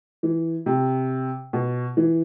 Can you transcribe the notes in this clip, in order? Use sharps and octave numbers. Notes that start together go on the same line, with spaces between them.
E3
C3
B2
E3